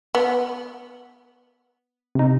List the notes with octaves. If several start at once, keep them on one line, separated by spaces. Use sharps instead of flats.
B3
C3 D#4